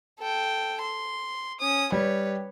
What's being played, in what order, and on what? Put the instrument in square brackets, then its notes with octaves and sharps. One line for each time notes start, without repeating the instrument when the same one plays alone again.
[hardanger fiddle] A4 G5
C6
C#4 D#6
[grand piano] G3 [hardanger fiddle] B4 C#5